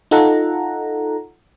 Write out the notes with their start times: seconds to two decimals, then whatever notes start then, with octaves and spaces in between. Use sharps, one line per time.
0.11 D#4 F4 A4 F#5 A#5